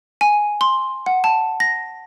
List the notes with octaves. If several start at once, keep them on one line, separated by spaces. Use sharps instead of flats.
G#5
C6
F#5
A5
A#6